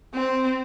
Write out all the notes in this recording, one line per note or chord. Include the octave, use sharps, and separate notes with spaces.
C4